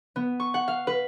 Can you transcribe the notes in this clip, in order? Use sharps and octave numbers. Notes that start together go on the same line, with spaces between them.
B3
C#6
F#5
F5
B4